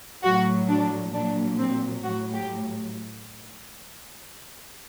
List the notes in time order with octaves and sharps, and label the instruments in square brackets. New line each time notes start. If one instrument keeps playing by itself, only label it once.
[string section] A2 F#3 F#4
D4
A#2 F#3 D4
C4
A2 F#3 F#4
G4